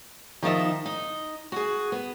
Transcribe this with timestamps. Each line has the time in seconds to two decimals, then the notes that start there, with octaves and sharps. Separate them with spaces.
0.42 D#3 F3 D#4 E5
0.86 D#4
1.52 F#4 G#4
1.92 B3